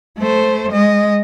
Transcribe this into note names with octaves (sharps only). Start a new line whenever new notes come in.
A3 C5
G#3 D#5